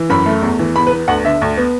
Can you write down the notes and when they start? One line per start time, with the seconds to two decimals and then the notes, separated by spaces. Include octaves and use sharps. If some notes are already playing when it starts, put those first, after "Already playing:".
Already playing: E3
0.10 F#2 B5
0.26 A3
0.42 E2
0.59 E3
0.76 E2 B5
0.87 B4
0.92 B3
1.08 D2 F#5
1.25 D3 E5
1.41 D2
1.57 B3